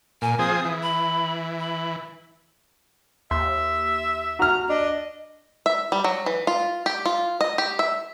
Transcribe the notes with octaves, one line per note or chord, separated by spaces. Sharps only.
A#2 G#5
F3 C4 G#4 D#6
E3
B5
B5
D#2 E5 C6
F#4 A#5 F6
D4 D#5
E5
G3
F#3
E3
F4
G4
F4
D#5
G4
E5